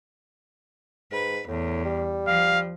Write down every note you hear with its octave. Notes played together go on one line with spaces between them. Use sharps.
G#2 B4
E2 A2
G3
F3 F5